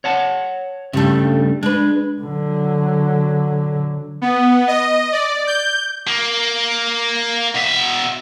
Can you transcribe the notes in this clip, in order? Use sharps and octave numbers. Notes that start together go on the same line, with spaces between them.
C#5 F#5 A5
G2 C#3 G3 A3 A4
G#3 D4 B4
D3 F#3
B3
D#5
D5
G6
A#3
B2 E5